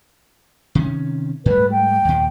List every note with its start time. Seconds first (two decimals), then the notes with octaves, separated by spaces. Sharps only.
0.75 C3 D#3 C#4
1.46 G#2 G3 A3 B4
1.71 G5
2.05 D#2 A#2